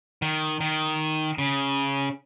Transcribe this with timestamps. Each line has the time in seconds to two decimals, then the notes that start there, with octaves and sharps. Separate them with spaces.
0.22 D#3
0.61 D#3
1.38 C#3